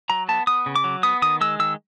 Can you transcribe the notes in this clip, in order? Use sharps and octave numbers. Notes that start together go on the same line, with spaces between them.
F#3 A#5
B3 A5
B3 D#6
C#3
D6
F#3
B3 D#6
D#3 D#6
G#3 E6
D#3 E6